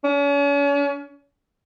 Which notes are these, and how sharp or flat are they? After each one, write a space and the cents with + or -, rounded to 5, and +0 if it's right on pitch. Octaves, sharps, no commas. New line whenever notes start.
C#4 +40